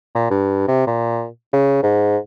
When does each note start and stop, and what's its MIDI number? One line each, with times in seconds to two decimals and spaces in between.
0.15 0.27 46
0.31 0.63 43
0.68 0.86 48
0.87 1.27 46
1.53 1.80 49
1.83 2.18 44